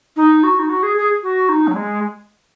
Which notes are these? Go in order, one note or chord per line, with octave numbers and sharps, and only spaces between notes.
D#4
F#4
D#4
F#4
G#4
G#4
F#4
D#4
F#3
G#3